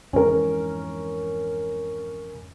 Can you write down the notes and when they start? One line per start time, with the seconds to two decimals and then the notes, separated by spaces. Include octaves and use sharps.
0.13 F2 G#2 E3 C#4 A#4